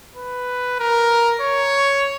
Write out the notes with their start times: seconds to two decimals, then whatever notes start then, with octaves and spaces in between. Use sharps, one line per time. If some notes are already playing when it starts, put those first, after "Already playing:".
0.16 B4
0.80 A#4
1.41 C#5